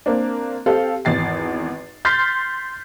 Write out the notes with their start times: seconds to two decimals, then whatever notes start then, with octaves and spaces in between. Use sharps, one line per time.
0.06 A#3 C4 D4
0.66 C4 G4 A4 F5
1.05 G#1 E2 A6 C7
2.05 C6 F6 G6 A6 B6 C7